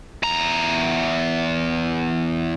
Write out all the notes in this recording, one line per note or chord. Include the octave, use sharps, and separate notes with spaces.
E2 A#5